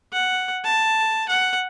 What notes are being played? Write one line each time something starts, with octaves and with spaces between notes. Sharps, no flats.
F#5
A5
F#5